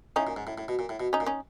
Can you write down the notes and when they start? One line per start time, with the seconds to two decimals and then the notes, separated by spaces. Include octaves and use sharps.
0.16 A2 C#4 D#4
0.27 A#2
0.36 G#2
0.47 A2
0.58 A2
0.68 B2
0.79 A#2
0.89 A2
1.00 B2
1.13 C#4 D#4
1.20 A#2
1.26 C#4 D#4